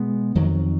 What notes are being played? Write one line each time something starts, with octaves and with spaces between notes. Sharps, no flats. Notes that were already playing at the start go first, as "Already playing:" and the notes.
Already playing: B2 G#3 B3
F2 D#3 F#3